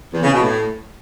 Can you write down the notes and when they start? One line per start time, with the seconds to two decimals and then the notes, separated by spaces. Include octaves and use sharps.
0.12 E2
0.22 C#3
0.32 B2
0.42 A2